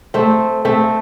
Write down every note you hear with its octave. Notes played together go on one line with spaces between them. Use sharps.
A3 C4
A3 C4